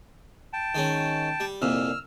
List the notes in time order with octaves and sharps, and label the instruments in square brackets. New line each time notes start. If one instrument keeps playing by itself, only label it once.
[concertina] G5 A5
[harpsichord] D#3 G#3 C#4
G3
[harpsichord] C2 F2 A#2 [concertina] E6 F6